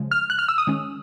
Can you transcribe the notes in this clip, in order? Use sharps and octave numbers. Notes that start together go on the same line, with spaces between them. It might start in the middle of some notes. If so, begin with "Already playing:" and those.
Already playing: C#3 F3 G#3
F6
F#6
F6
E6
D#6
D#3 G#3 C#4